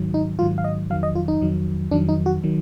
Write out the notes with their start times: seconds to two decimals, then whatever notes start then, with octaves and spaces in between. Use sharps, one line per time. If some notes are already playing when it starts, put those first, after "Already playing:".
Already playing: G#2 D#3 F#3
0.14 D#4
0.39 G#2 D#3 F#3 F4
0.58 F5
0.64 D#5
0.90 F2 D#3 F#3 F5
1.03 D#5
1.15 F4
1.28 D#4
1.41 F2 D#3 F#3
1.91 F2 D#3 F#3 D4
2.09 D#4
2.26 F#4
2.44 D#3 F#3